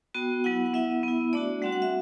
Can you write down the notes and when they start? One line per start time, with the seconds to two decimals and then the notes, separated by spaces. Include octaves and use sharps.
0.14 B3 F#4 G5
0.44 F#3 B3 E4 F#5
0.66 F#5
0.74 B3 E4 E5
1.03 B3 E4
1.33 A3 D4 F#4 D5
1.62 G3 C4 F#4 F#5
1.72 F#5
1.82 E5